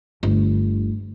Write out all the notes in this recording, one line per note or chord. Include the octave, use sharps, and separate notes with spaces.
G1 D2